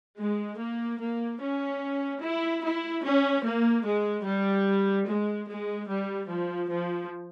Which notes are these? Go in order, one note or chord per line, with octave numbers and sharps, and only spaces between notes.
G#3
A#3
A#3
C#4
E4
E4
C#4
A#3
G#3
G3
G#3
G#3
G3
F3
F3